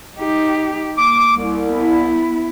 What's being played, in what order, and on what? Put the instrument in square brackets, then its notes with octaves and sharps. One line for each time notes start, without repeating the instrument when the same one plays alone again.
[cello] D#4 G4
[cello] A#3 [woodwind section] D6
[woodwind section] C2
[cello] B3 E4